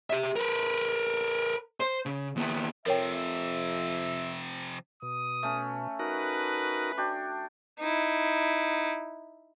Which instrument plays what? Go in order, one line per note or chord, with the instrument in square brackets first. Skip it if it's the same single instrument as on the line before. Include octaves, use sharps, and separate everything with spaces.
[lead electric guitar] G4 E5
A#4 B4
C5
C#3
D#2 B3
[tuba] F2 [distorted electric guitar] C3 F3 [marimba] A#4 C#5 G5 [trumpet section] E5
[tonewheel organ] B2 [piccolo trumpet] D#6
[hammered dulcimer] A3 C#4
[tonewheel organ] D#4 F#4 A#4 [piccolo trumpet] B4
[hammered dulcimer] D4 F#4 G5
[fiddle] D#4 E4